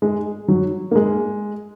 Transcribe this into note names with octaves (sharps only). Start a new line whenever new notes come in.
G#3
F#3
A#3
G#3